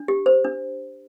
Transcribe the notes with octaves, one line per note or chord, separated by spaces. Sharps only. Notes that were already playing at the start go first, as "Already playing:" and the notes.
Already playing: D4
G4
C5
D4